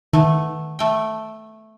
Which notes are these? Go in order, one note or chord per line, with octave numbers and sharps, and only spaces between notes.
D#3 A3 B3
A3 G5